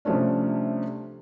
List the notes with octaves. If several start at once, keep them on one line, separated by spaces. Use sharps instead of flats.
C3 F3 G3 A3 C#4 D4